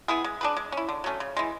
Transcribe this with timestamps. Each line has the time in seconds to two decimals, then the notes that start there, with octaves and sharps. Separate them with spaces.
0.08 B3 E4 G#4
0.24 G#3
0.41 D4 G#4 B4
0.57 G#3
0.72 C#4 E4
0.89 D3
1.04 F#3 A3 C#4
1.20 C#3
1.37 E3 G#3